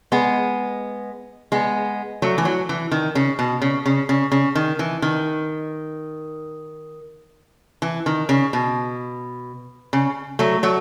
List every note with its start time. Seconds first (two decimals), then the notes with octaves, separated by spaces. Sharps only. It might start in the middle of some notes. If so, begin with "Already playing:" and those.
0.12 G#3 B3
1.52 G#3 B3
2.22 F#3 A3
2.38 E3
2.45 F#3
2.69 E3
2.92 D#3
3.15 C#3
3.39 B2
3.62 C#3
3.86 C#3
4.09 C#3
4.32 C#3
4.55 D#3
4.79 E3
5.02 D#3
7.82 E3
8.06 D#3
8.29 C#3
8.53 B2
9.93 C#3
10.39 F#3 A3
10.63 F#3 A3